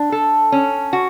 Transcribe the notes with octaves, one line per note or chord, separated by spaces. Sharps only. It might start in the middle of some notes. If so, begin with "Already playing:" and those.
Already playing: D4
A4
C#4
F#4